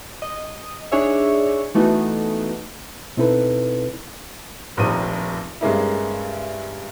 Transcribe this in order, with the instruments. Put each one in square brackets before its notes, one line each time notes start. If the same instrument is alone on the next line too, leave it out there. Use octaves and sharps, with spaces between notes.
[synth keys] D#5
D4 D#4 G#4 C#5 E5
E3 A3 B3 D#4 F#4
[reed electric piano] B2 C4 D#4 E4 A4 B4
[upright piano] F1 A#1 D#3 F3 A#5 D#7
G2 C#3 G#3 A#3 D#4 E4